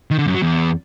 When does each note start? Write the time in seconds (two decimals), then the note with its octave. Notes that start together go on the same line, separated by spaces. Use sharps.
0.11 D#3
0.19 D3
0.27 F#2
0.34 F#3
0.42 E2